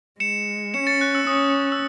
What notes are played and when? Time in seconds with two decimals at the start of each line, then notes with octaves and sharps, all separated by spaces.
0.20 G#3 C#7 E7
0.74 C#4 C#7 E7
0.87 A6 C#7
1.01 F#6
1.15 E6
1.27 C#4 D#6
1.72 E6